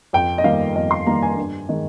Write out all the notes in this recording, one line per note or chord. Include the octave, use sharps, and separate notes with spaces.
F2 G5
D#5
D#3 G3 A#3 F5
F2 D#5
C6
D#3 G3 A#3 A#5
G#5
G2
D#3 G#3